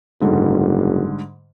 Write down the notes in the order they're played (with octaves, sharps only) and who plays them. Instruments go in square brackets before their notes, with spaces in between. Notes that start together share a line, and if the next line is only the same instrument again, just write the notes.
[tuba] F#1 [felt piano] G#2 D3 G3